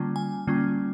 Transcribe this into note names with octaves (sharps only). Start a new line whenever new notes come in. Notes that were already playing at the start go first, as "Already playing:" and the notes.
Already playing: D3 G3 A#3 C#4 F4
G#5
D3 G3 A#3 C#4 F4